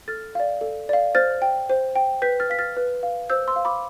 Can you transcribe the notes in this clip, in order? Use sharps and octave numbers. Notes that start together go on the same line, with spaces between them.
A4 F6 A6
D5 F5
A4
D5 F5
C5 F6 A6
G5
C5
G5
B4 G6 B6
F6 A6
F5 B6
F6 A6
B4
F5
C5 E6 G6
C6 E6
F5
B5 D6